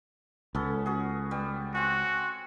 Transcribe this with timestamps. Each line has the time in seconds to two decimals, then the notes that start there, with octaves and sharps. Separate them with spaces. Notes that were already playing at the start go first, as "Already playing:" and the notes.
0.55 C#2 B3 C#4 A4
0.86 F#4 G#4
1.31 G3 B3
1.75 C4 F#4 G#5